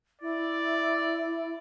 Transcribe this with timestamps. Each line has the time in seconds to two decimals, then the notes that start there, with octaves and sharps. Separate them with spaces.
0.22 E4 D5